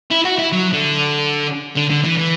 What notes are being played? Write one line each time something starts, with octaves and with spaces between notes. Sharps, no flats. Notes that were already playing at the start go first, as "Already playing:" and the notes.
E4
F#4
E4
F#3
D3
D3
D3
E3
E3